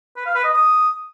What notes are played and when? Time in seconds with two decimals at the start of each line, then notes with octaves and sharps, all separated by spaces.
0.16 B4
0.26 F5
0.35 B4
0.44 D#5
0.53 D#6